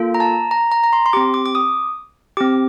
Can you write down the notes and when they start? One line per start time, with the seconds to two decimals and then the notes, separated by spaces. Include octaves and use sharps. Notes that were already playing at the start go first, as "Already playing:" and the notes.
Already playing: A#3 F4 A4
0.14 A#5
0.20 A5
0.51 A#5
0.72 A#5
0.84 A#5
0.93 C6
1.06 C6
1.13 C4 G4 D6
1.34 D6
1.46 D6
1.55 D#6
2.37 C4 G4 D6